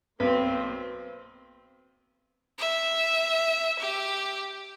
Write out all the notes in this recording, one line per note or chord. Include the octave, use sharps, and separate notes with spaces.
B1 A#3 C4 B4
E5
G4